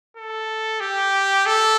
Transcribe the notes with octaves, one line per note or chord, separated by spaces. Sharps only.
A4
G4
A4